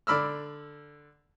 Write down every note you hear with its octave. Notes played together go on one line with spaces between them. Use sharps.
D3 D5 B5 E6 F6